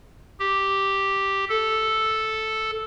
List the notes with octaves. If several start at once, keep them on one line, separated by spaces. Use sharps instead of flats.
G4
A4